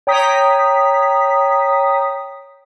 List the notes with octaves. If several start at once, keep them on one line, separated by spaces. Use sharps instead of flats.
C#5 G5 A#5 D#6 B6